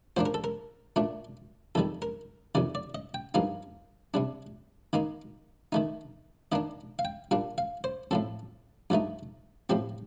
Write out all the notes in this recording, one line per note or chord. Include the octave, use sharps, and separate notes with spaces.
A#2 F3 A#3 D4 C5
A#4
A4
A#4
A#2 A3 D4
F2 D#3 G3 A4
A#4
F2 C3 D#3 D5
D5
D#5
G5
G2 F3 A#3 D#4 F5
C3 G3 D4
D#3 A#3 D#4
D#3 A3 D#4
D#3 A#3 D4 D#5
F5
G5
A#2 G3 D4 F5
F5
C5
A2 F3 C4 A4
G2 F3 A3 D#4
A2 F3 C4 G4